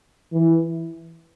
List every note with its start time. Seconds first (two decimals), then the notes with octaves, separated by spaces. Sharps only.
0.32 E3